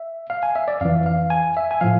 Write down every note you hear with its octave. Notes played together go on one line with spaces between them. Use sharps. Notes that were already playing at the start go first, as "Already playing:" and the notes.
Already playing: E5
F5
G#5
E5
D5
F2 E3 F5
F5
G#5
E5
G#5
A2 F3 F5